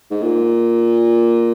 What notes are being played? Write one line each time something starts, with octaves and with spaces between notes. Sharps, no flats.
G#2
A#2